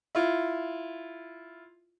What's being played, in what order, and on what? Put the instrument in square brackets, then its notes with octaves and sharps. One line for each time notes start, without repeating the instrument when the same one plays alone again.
[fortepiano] E4 F4